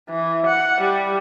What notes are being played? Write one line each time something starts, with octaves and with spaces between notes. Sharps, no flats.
E3
F#5
G3